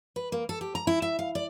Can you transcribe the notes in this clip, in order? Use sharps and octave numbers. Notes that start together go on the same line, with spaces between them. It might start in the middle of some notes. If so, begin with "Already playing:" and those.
B4
A#3
A4
G4
A#5
E4
E5
F5
D5